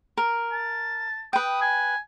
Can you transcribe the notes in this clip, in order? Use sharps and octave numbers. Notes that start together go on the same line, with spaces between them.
A#4
A5
B4 G5 D#6
G#5